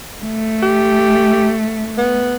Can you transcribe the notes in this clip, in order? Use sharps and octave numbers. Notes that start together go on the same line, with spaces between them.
A3
G4
B3